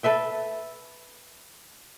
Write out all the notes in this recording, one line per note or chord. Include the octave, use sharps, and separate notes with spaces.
A4 B4 E5 G5